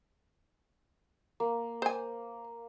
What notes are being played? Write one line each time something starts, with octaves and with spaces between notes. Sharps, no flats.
A#3
C5 G#5